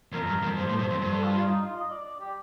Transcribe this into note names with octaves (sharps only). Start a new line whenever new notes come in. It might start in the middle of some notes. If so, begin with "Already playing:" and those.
F2 A#4
G2
F2
G2 C5
A2
G2 C5
F2
G2 C5
A4
F4
F4
D#4
F4
D#5
D5
D5
G4